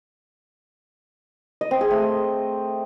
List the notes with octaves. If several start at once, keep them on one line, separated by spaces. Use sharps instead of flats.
D#5
C4
G#4
A3